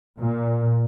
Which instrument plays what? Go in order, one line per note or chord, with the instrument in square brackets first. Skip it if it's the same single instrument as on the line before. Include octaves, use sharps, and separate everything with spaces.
[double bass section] A#2